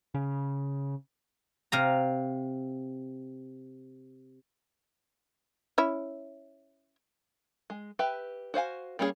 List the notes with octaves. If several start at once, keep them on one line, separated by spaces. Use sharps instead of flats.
C#3
C3 F5 A#5
C#4 E4
G#3
G4 B4 E5 G5
F#4 C5 F5 G#5
G3 A#3 C#4 D4 G#4